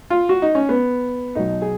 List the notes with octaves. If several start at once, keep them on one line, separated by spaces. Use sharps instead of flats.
F4
F#4
D#4
C#4
B3
B1 B2 F#3 D#4
G#4